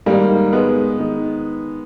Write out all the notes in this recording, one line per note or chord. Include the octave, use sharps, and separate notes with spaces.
G#2 D#3 G3 A#3
G#3 B3
D#3